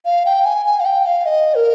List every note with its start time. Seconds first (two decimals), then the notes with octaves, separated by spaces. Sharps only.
0.05 F5
0.26 G5
0.45 G#5
0.66 G#5
0.80 F5
0.85 G5
1.06 F5
1.26 D#5
1.55 A#4